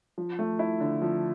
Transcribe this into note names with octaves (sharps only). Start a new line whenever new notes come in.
F3
A3
E4
D3
F3